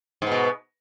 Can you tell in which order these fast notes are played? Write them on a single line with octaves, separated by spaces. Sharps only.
G#2 B3 B2